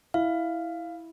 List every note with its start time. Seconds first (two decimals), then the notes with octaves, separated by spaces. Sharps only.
0.14 E4 F5